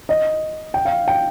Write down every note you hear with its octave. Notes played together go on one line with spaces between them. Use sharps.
D#5
G5
F5
G5